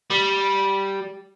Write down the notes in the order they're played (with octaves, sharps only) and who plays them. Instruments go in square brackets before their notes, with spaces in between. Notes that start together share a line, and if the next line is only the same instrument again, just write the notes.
[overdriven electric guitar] G3